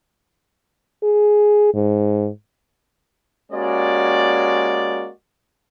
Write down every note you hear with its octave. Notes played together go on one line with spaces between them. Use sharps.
G#4
G#2
G#3 A#3 C#4 F#4 G4 D5